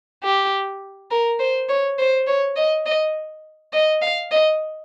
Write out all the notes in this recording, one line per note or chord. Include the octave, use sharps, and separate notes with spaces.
G4
A#4
C5
C#5
C5
C#5
D#5
D#5
D#5
F5
D#5